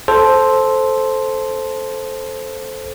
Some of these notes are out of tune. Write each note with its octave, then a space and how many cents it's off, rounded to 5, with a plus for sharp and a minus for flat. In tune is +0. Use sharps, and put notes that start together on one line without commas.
A4 -10 C5 +0